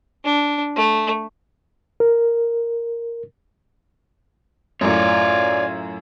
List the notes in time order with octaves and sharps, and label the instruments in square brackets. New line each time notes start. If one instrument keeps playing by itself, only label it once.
[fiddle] D4
A3
[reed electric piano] A#4
[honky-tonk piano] F#2 A2 [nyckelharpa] F4 G#5 [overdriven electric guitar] C#5 D5